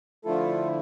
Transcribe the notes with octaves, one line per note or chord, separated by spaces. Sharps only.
D3 F3 A3 E4 F4 A4